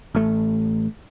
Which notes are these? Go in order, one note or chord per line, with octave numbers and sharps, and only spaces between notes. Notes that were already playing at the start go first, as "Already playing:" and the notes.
A1 A3